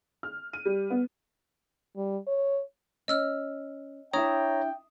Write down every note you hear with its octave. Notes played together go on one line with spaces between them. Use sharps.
F6
D#7
G3
B3
G3
C#5
C#4 D#5 E6 F6
D4 E4 C#5 E5 G5 A#5 D#6